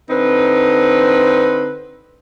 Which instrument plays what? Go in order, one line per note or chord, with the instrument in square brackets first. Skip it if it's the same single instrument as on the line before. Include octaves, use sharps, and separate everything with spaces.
[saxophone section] D3 C4 D#4 B4